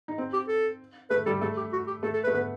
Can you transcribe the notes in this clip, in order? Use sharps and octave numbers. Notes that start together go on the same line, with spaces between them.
D#4
C4
G4
A4
A3 B4
G3 A4
A3 A4
G4
F#4
G4
A3 A4
A4
B4
A3
B3 B4